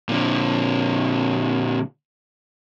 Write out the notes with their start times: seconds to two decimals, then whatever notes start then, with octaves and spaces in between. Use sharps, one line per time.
0.09 A#2 D3